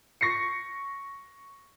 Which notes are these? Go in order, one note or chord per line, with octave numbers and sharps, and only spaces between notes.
C#6 A#6 C7 C#7